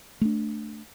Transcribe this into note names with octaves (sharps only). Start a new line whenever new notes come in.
A3 D4